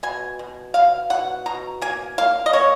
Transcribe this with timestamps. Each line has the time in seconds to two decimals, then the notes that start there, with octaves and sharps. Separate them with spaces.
0.03 B2 G#5
0.39 B2
0.74 B2 F5
1.10 B2 F#5
1.46 B2 A#5
1.82 A#3 G#5
2.18 A#3 F5
2.46 D#5
2.53 A#3 C#5